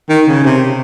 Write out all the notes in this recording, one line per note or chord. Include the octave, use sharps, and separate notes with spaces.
D#3
C#3
C3